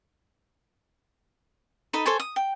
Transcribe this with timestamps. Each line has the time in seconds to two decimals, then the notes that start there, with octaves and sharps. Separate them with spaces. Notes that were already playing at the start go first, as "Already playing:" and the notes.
1.93 D#4 A4 D#5 B5
2.06 A4 C5 C#5 G#5
2.20 D#6
2.36 G5